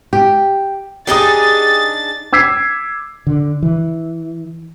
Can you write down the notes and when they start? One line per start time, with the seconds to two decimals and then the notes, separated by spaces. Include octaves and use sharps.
0.13 G4
1.07 D4 D#4 G4 G#4 D#6 A6
2.33 D6 E6 G#6 B6 C7
3.27 D3
3.63 E3